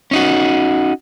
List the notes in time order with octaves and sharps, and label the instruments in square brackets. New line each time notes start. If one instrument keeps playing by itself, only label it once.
[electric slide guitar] C#4 D#4 F#4